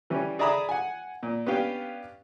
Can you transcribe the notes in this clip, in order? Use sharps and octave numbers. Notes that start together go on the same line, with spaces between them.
E3 G3 C#4
G#4 D5 E5 A#5 B5 D#6
F#5 G#5
A#2
B3 C#4 D4 G4 F5 G5